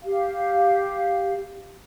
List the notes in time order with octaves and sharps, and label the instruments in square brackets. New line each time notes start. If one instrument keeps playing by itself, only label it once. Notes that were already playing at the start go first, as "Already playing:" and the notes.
[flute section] G4 F5